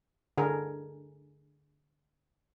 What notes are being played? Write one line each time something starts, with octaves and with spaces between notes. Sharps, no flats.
D3 G#4 A#4